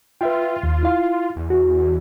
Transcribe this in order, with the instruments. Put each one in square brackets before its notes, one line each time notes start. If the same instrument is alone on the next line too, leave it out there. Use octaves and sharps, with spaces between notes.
[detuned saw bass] F4 [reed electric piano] B4 E5 G5
[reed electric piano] D#2
E4 F5
[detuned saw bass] E2
[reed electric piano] F#4